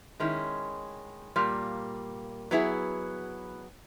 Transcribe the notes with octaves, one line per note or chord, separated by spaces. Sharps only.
D#3 G#3 C#4 E4
A#2 G3 A#3
F#3 B3 E4 G#4